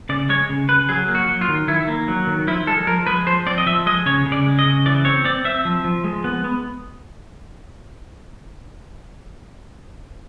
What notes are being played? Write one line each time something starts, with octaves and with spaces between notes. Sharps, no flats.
C#3 D5
G#3 C#5
C#3
C#3 B4
F#3 G#4
A#3
F#4
F#3
F4
D#3
D#3 E4
A#3
F#3
D#3
F3 E4
G#3 A4
F3 A#4
G#3 B4
F3 C5
C4 D5
D#5
F3 E5
G#3 D#5
C#3 C#5
C#3
D5
G#3
D#5
C#3
E3 D5
C4 C#5
C4 D5
C4 E5
F3
F3
G#3
B3
B3